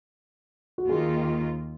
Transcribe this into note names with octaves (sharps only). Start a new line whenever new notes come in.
F#4
D#2 D#3 A#3 F4 G#4